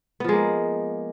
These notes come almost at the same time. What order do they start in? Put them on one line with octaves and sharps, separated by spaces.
B3 F3 G#3 A#3